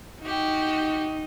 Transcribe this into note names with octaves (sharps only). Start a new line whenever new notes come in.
D#4 F#4 G4